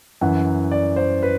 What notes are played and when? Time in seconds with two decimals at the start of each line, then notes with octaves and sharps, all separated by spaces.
0.21 F#2 E3 F#5
0.71 D5
0.96 C5
1.23 B4